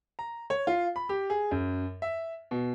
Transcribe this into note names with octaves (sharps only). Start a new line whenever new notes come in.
A#5
C#5
F4
B5
G4
G#4
F#2
E5
B2